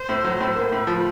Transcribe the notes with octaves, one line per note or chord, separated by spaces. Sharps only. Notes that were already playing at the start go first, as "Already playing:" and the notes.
Already playing: C5
A2
F#3
A2
A#3
A2 B4
F3